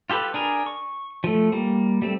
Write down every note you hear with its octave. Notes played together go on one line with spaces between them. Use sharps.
F4 G4 A4 B4
D4 G#4 A#4
C#6
F3 A3
G3 A#3
G3 A3 C4